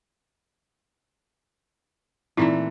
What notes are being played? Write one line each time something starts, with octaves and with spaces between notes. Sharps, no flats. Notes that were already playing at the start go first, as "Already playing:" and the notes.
A#2 E3 A3 C4 D#4 E4